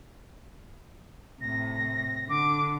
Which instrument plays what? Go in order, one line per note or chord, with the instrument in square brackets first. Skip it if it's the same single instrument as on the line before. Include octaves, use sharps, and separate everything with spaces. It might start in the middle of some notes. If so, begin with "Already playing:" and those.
[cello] A2 C3 [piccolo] A#6
[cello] D3 [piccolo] D6